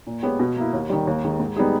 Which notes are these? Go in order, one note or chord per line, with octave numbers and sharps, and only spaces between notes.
A#2
G#3 B3 G4 C#5
B2
A#3 E4
D#2
D#3 G3
D#2
D#3 G#3
G#2
G3 B3 D#4 G#4